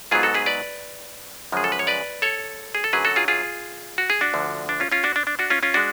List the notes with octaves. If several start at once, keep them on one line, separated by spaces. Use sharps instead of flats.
G#2 F#3 B3 F4 G#4
F#4 A4
G#4 B4
B4 D5
F#2 C#3 F3 G#3 G#4
A4
B4
C#5
B4 D5
A4 C#5
G#4
A4
F#2 D3 F#3 G#4 B4
F#4 A4
F4 G#4
F4 G#4
F#4
G#4
D4 F#4
D2 D3 F3
D4
C#4 F4
C#4 F4
D4 F#4
D4
D4
D4 F#4
C#4 F4
C#4 F4
G#3 D4 F#4